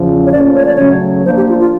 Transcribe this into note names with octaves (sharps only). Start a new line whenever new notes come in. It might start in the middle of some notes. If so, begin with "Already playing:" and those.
Already playing: E2 C#3 F3
C#5
A#2 F3 A3 C#4 D5
C#5
D5
C#3 F#3 A3 C#5
F3 A#3 D4 C5
G4
F4
F4